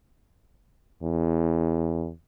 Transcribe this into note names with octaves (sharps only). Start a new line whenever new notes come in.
E2